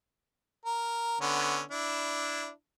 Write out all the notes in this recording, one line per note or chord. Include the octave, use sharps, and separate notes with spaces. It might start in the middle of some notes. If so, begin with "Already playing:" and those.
A#4
D3 B3 C#4
D4 E4